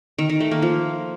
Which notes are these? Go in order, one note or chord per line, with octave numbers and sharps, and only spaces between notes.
D#3
D#3
A3
A#3
F3